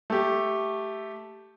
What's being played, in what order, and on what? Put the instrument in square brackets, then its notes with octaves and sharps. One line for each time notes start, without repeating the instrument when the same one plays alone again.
[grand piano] A3 G4